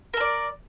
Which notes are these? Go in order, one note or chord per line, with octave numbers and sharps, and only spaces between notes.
A4 A#4 D5